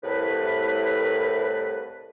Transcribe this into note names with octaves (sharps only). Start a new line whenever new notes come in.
C2 A2 B4